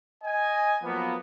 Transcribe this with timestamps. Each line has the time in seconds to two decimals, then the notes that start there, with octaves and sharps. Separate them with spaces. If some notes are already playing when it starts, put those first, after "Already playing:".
0.24 D#5 G#5
0.83 F3 F#3 A#3 B3